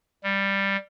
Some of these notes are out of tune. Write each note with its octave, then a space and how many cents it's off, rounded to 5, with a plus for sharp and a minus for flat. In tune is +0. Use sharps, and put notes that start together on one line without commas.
G3 +5